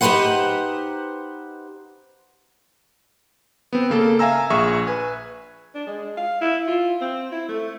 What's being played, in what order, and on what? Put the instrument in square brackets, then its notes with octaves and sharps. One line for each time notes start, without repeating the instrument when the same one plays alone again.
[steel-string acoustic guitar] D#4 G4 G#4 B4 C5 F#5
[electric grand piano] B3 C4
C#3 A#3 A4
E5 F5 G#5 A#5 E6
A#1 G#4 E5 C#6
B4 G#5
[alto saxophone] D4
G#3
F5
E4
F4
C4
E4
A3